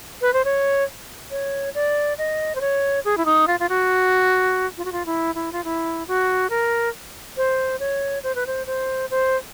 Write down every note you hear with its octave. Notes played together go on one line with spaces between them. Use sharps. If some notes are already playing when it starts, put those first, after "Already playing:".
B4
C5
C#5
C#5
D5
D#5
C5
C#5
G#4
E4
D#4
F4
F4
F#4
F4
F#4
F4
E4
E4
F4
E4
F#4
A#4
C5
C#5
C5
B4
C5
C5
C5